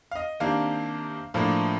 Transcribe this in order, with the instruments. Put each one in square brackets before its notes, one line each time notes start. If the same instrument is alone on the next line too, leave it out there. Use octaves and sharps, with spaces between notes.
[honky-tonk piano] F5
D#5
C3 D#3 A#3 D4 F5
A2 F3 A#3 D4 F5